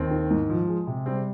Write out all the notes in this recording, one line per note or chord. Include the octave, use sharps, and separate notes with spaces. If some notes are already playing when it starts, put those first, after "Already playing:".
Already playing: D#2 C4
D#3
G#2
F3
G#3
C3
G3 C4